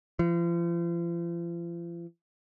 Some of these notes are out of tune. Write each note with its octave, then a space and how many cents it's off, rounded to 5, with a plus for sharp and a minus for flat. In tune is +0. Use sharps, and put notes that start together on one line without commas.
F3 -40